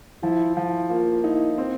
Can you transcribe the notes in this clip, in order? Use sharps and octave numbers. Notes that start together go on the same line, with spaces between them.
F3 E4
F3 E4
A#3 F4
D#4 E4
C4